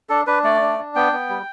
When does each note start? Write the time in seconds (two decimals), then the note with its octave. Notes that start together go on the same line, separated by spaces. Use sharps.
0.09 D4 A4
0.27 D4 B4
0.44 A3 D5
0.61 D4
0.78 D4
0.95 B3 G5
1.12 B3
1.29 G3